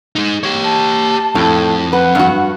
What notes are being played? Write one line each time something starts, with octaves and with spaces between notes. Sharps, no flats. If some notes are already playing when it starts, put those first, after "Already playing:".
G#3 D#4
G4 C#5
A5
F2 A2
B4 F#5
G2 F#4